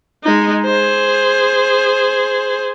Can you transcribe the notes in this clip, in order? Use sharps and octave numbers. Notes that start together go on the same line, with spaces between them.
G#3 D#4
G#4 C5